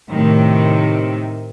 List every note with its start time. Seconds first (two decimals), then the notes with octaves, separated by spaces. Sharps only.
0.11 A2 C3 D#3